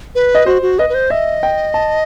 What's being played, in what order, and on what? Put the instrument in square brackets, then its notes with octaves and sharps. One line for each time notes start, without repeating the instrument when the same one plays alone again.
[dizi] B4
[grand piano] D#5
[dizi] F#4 [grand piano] C5
[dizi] F#4
[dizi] B4 [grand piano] D#5
[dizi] B4
C5
[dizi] D#5 [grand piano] E5
[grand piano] G5
A5